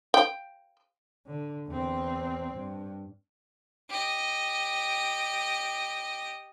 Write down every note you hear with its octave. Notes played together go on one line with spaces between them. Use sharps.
G5
D3
E2 C4
G2
G4 D#5